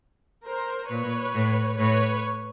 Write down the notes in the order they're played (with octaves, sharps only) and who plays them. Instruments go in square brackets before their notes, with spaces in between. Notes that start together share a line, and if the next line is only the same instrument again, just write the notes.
[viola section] A#4 C5
[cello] A#2 [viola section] B4 C#5
[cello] A2
[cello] A2 [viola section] B4 C#5